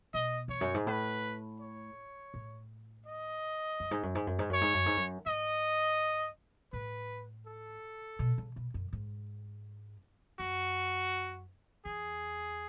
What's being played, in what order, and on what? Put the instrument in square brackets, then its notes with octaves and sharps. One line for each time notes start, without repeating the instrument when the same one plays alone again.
[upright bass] B2 [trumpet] D#5
[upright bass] E2 [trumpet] C#5
[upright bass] F#2
G#2
[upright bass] A2 [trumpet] B4
[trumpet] C#5
[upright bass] A2
[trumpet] D#5
[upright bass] F#2
G#2
F#2
G#2
F#2
G#2
[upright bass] F#2 [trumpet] C#5
[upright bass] G#2
F#2
G#2
F#2
[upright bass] G#2 [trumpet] D#5
[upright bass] A2 [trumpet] B4
[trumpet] A4
[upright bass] B2
C#3
B2
F#2
G#2
[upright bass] F#2 [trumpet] F#4
[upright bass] E2 [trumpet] G#4